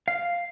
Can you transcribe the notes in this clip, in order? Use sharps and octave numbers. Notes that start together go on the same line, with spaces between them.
F5